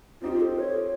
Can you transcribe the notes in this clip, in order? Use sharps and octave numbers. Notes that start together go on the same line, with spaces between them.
C4 D#4 F4 G4 C5
A4
C#5